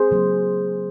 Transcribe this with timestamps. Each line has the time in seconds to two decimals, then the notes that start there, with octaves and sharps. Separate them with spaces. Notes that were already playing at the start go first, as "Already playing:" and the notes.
Already playing: G#4 C5
0.11 C#3 F#3 A#3